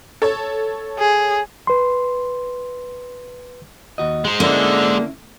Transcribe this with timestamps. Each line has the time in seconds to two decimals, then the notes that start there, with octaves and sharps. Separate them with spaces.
0.22 A4 C#5
0.99 G#4
1.67 B4 C6
3.98 D#2 F#4 D#5
4.25 G#3 C5
4.40 D3 A#3 C#4 E4